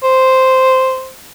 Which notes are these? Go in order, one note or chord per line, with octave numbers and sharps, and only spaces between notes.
C5